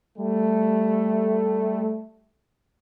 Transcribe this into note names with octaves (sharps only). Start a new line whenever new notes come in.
G3 A3